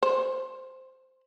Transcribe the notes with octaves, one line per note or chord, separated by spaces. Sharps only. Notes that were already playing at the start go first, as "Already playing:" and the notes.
C5